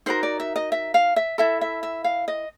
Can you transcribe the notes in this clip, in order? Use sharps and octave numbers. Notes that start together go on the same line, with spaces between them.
D#4 F#4 A#4 C5
D5
E5
D#5
E5
F5
E5
E4 A4 E5
E5
E5
F5
D#5